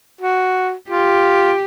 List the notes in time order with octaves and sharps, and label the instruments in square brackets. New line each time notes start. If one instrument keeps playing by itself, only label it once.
[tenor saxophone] F#4
[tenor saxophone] F4 [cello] G4